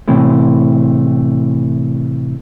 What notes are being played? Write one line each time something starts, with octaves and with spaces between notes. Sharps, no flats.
A2 C3 E3 A3